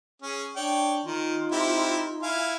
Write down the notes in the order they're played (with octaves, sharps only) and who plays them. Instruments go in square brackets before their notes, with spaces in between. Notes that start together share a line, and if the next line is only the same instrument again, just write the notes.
[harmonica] C#4 G#4
[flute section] D4 [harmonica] C#5 D5 G5
[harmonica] D#3 [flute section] D#4 F4 C6
[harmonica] C4 E4 G4
E4 F5 G#5